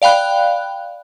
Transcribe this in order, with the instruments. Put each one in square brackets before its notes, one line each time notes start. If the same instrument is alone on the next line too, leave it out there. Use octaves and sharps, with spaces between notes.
[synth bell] D5 F5 G5 B5 F#6